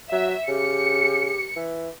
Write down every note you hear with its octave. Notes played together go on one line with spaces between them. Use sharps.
F#3 E5
C#3 G4 C#7
E3